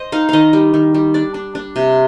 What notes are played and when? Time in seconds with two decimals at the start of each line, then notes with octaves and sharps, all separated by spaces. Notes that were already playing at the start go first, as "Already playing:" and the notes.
Already playing: C5 D#5
0.12 D#4 F5
0.29 D#3 D#5 F5
0.53 G3
0.74 D#3
0.94 G3
1.14 D4 D5
1.34 D4
1.55 D4
1.76 C3